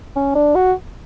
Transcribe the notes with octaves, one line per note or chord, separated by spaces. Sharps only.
C#4
D4
F#4